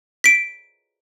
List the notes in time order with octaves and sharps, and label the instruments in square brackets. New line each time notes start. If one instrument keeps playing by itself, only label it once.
[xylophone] B6 D7